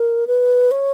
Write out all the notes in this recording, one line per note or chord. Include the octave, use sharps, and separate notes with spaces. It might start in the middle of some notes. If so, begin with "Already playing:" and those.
Already playing: A#4
B4
C#5